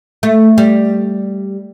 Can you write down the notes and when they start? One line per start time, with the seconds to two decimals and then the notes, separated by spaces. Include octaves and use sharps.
0.23 A3
0.58 G3